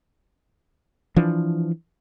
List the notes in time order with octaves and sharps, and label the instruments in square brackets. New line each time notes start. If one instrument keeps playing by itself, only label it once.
[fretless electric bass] E3 F3 D4